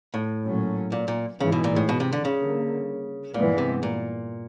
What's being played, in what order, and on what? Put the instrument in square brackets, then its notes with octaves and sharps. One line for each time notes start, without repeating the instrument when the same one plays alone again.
[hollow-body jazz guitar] A2
[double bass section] A#2 F#3 A3 C#4
[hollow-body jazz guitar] A#2
A#2
[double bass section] G#2 E3 G#3 [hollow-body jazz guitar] C#3
[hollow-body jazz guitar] B2
A#2
A2
B2
C3
D3
C#3
[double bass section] D3 G3 A#3
[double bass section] G2 E3 G#3 B3 [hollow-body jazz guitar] A#2
[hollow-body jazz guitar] C3
A#2